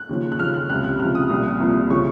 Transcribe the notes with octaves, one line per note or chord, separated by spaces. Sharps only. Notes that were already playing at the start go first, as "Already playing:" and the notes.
Already playing: F#6
D#2 C#3 F3
F#6
D#2 C#3 F3 F6
F#6
C#2 C3 F3 F#6
F#6
C#2 C3 F3 F6
D#6
C2 A#2 F3
C2 A#2 F3
C#3 F3 C#6